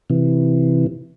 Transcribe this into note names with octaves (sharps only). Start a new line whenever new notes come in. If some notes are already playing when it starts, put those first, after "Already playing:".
C3 E3